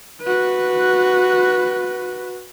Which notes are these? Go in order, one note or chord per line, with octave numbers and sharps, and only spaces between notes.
F#4 B4